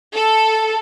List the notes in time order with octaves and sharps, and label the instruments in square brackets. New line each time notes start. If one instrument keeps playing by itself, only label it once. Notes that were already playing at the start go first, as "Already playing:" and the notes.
[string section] A4